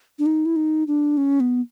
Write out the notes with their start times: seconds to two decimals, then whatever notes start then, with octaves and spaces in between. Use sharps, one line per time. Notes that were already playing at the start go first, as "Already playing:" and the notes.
0.19 D4
0.26 D#4
0.46 E4
0.56 D#4
0.87 D4
1.17 C#4
1.40 B3